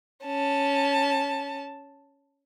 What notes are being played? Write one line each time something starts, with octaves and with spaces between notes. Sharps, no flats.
C#4 A5